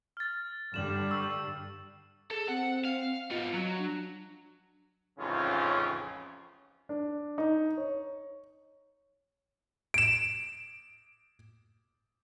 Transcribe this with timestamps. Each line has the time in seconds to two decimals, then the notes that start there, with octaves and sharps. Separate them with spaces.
0.17 F6 A6
0.74 G2 D3 G3 E7 F#7
1.11 C#6 E6 C7
2.31 G#4 A4
2.48 C4 F#5
2.85 F5
3.31 B3 F4 D#5
3.54 F#3
3.78 D4
5.19 A1 F2 G#2 C#3 C#4 F4
6.89 D4
7.38 D#4
7.77 C#5
9.94 D7 E7